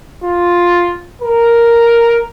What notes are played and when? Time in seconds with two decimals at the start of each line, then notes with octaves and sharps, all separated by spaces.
0.23 F4
1.22 A#4